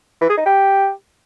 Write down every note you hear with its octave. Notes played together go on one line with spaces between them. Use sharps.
E3
G#4
D#4
G4